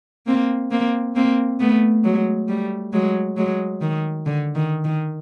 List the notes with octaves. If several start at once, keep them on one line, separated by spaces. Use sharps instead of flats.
A#3 C4
A#3 C4
A#3 C4
A3 B3
F#3 G#3
G3 A3
F#3 G#3
F#3 G#3
D#3
D3
D#3
D#3